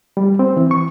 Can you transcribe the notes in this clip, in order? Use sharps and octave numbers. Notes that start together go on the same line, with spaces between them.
G3
C4
E3
C#6